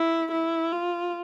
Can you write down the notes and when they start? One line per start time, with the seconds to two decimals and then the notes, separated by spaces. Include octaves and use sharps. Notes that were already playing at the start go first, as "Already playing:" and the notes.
Already playing: E4
0.32 E4
0.72 F4